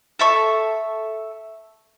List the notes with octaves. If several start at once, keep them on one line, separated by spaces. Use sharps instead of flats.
A4 E5 C#6